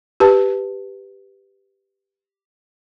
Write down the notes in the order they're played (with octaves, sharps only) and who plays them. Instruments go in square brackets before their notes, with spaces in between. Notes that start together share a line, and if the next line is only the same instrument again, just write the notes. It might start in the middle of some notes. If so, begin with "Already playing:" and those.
[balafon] G4 B4 A5